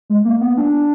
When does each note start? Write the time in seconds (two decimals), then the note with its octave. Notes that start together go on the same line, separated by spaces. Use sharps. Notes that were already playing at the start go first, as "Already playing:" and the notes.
0.10 G#3
0.25 A#3
0.41 B3
0.57 D4